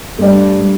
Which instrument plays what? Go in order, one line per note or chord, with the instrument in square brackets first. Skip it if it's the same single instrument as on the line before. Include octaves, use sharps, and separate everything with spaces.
[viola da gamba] G2 [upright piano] A3 D4 G4 D5